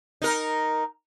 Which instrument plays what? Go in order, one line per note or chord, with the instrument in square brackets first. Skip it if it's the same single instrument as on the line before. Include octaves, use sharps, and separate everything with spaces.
[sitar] D#4 A#4